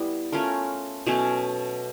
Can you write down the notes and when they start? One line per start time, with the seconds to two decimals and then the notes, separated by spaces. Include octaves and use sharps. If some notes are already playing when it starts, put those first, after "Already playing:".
Already playing: G3 B3 E4
0.32 A3 C#4 F4 A#4
1.06 B2 F#3 A3 C#4